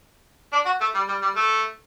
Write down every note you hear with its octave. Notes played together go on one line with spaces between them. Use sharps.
D4
F#4
A3
G3
G3
G3
A3